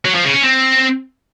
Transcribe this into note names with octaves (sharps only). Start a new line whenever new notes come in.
F#3
F3
C#3
C#4
C4